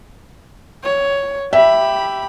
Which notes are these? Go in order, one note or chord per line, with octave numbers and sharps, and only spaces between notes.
C#5
G4 E5 B5